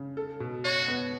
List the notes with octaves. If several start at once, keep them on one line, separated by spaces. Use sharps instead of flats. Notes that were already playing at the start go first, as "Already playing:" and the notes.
Already playing: C#3
A4
B2
F#4 C#5
B3